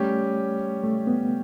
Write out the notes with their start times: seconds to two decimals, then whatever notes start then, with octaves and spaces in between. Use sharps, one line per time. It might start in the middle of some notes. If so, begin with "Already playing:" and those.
Already playing: G3 A3 C#4 G4
0.83 A3
1.07 B3